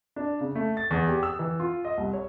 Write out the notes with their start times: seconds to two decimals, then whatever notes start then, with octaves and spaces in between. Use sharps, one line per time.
0.16 D4
0.41 C#3
0.56 A3
0.77 A6
0.91 E2
1.08 G4
1.23 E6
1.39 E3
1.60 F4
1.85 D#5
1.97 C2
2.13 C#5